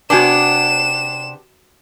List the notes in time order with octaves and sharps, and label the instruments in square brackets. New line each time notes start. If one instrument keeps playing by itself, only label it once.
[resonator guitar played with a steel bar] C3 B3 D4 [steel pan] F#4 G#5 D6 [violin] E7